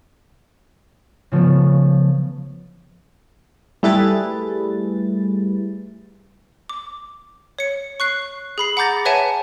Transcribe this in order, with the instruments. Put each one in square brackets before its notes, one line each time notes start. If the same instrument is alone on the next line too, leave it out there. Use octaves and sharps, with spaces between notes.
[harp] C#3 F3 A3 B3
[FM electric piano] G3 A3 E4 G#4 B4 A6
[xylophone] D6
C#5 C#7
C#6 F#6 C7
G#4 B5 C7
F#5 A#5 D6 G6 A6 A#6
B4 C#5 E5 F#5 G#5 A5